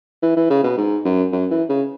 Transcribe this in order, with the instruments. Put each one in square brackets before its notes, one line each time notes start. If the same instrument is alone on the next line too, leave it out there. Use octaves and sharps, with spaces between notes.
[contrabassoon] E3
E3
C#3
B2
G#2
F#2
F#2
E3
C#3